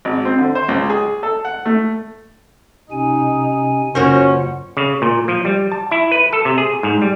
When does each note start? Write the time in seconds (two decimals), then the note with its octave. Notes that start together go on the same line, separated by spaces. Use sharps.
0.05 G#1
0.25 C4
0.38 D3
0.55 C5
0.68 C#2
0.90 G#4
1.23 A4
1.45 F#5
1.66 A3
2.91 C3 C#4 D#4 G#5
3.95 F#1 C#4 F4 F#4 A#4 C5 F#5
4.77 C#3
5.02 A#2
5.28 F3
5.45 G3
5.72 A5
5.91 E4
6.11 B4
6.33 A4
6.45 C3
6.58 G#4
6.83 G#2
7.02 G3